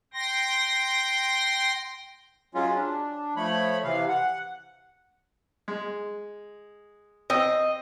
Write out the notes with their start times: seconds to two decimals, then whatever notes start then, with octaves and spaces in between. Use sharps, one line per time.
0.14 G5 C6 A#6
2.55 F#3 G#3 C#4 F4
2.75 D4
3.36 F3 A3 C#5 B5
3.84 C3 E3 F5
4.08 F#5
5.68 G#3
7.30 C4 D#5 G5 E6